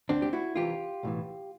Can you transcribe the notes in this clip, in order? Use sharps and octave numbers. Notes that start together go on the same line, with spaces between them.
D2 D3 C4 D4
G4
E4 F#4
C2 C3 E3 F4 G4
B1 A2 E3